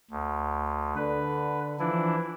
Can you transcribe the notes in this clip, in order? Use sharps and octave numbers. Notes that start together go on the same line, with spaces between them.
D2
D3 B4
E3 F3 D4 E4